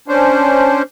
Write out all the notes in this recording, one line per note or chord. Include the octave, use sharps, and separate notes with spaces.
C#4 D4 C5